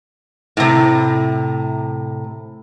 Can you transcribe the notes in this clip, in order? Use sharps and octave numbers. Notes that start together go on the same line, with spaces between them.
A2 C3